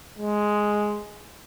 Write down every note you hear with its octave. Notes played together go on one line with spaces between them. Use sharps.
G#3